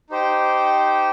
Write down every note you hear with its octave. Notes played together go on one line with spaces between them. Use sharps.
D#4 G4 C5 G5